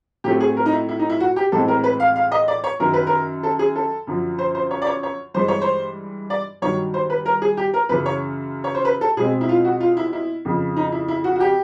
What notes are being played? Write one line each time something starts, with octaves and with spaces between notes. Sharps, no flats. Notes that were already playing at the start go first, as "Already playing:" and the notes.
A2 F#3 A3 C4 G4
G#4
A#4
D#4
E4
E4
D#4
E4
F#4
G4
A2 E3 G#3 C4 A4
A#4
B4
F5
F5
D#5
D5
C#5
F#2 D#3 F#3 A#4
B4
A#4
A4
G#4
A4
F#2 D3 F3
C5
C5
C#5
D5
C#5
C#5
G2 E3 G#3 C5
C#5
C5
D5
G2 D#3 F#3 C#5
C5
B4
A#4
G#4
G4
A#4
F#2 C#3 E3 B4
C#5
C#5
C5
B4
A4
B2 G#3 C4 G#4
E4
F4
F#4
F4
E4
E4
F2 C#3 F3
D#4
E4
E4
F#4
F#4
G4